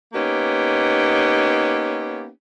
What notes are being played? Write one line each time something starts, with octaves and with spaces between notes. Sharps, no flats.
A#3 B3 C#4 D#4 G4